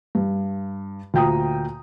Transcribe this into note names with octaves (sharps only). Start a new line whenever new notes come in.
G2
D2 A#2 G5 A#5 D#6